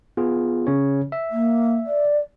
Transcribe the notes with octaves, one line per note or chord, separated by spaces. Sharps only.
B3 F4 G#4
C#3 C#4 C#5
E5
A#3
D5